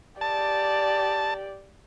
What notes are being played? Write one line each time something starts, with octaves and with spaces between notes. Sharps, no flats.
G4 D5 A5